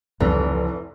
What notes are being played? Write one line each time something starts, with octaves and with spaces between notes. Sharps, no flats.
F1 C#2 G2 E3